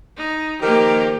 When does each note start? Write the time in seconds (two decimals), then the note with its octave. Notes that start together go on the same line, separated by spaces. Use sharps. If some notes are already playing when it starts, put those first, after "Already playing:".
0.17 D#4
0.61 D#3 F3 A#3 G4 A#4